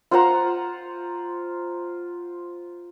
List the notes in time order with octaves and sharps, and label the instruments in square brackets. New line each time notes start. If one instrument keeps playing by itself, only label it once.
[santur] F4 C5 F#5 A#5